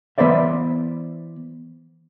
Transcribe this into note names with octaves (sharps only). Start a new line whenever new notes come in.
E3 B3 B4 C5 D5 E5